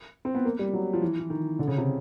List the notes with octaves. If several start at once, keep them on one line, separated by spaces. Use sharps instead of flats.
C4
B3
A#3
G3
F#3
F3
E3
E3
D#3
D3
C#3
C3